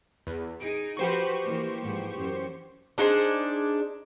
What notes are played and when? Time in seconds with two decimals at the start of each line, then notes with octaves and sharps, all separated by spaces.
0.27 E2
0.60 D#4 G#4 D7
0.97 F3 F#4 G4 B4 C5 C#6
1.43 E3 A#3
1.82 G#2 E3 F3
2.17 F#2
2.98 D4 D#4 G#4 C5